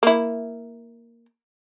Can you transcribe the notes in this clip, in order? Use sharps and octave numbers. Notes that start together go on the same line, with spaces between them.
A#3 E4